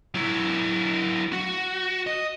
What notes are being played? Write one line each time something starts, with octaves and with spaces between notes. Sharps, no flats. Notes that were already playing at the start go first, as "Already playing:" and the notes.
F#3 E4
F#4
D#5